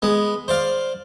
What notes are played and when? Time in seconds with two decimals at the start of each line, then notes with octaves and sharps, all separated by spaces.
0.02 G#3 B3
0.48 C5 D5 F5